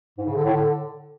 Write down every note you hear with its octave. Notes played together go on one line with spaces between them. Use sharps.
G#2
C#3
D3
A2
D3